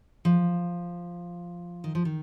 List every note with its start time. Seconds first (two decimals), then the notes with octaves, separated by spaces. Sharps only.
0.25 F3
1.84 D#3
1.95 F3
2.05 D#3